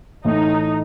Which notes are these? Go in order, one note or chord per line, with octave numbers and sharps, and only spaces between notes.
A2 E3 A3 D#4